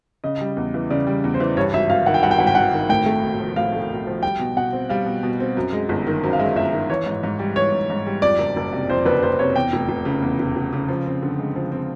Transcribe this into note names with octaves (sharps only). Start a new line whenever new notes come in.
C#3 D#5
G3
E2
E3
C#3 D5
G3
E2
C5
E3
G2 C#5
G#1 E5
G#1 F5
D#3 F#5
G5
G2 F#5
G5
G#1 F#5
G5
G#1 F#5
D#3
A2 G5
A3
B1
F3
A2 F5
A3
B1
F3
G3 G5
B2
B2 F#5
C4
G3 F5
B2
B2
C4
F#2
G#3
G1
D#3
F#2 C5
F5
G#3 E5
G1 E5
D#3
E3 C#5
G#2
G#2
G3
E3 C#5
G#2
G#2
G3
F2 D5
F#1
F#1
C3
F2 C5
F#1 B4
F#1 C5
C3 C#5
E2 G5
F1
F1
C#3
E2
F1
F1
C#3
F3
C4
D3
G#3
F3
C4